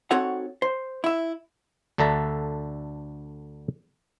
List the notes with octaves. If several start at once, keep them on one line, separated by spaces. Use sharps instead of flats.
C4 D#4 F#4 A4 C#5 F#5
C5
E4 E5
D2 D3 D4 A4 E5 A#5